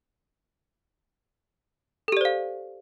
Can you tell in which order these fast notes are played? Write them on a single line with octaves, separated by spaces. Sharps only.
A4 G4 D5 C5 F5